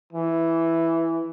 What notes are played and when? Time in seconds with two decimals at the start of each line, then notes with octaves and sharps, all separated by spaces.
0.13 E3